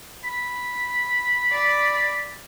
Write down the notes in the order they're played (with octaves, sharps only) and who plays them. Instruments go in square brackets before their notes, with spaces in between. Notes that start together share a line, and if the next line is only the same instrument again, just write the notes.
[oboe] B5
[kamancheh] D5